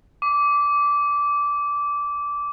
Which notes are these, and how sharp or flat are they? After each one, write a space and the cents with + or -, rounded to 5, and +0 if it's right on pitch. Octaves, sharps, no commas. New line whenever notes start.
D6 -15